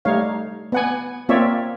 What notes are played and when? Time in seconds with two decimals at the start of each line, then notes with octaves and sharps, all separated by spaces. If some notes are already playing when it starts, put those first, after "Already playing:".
0.05 G3 A3 D#4 C#5 F5
0.72 B3 F#5 G#5
1.29 A#3 C4 F4 C#5 D5 E5